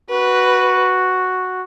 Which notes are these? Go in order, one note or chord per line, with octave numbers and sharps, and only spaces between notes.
F#4 B4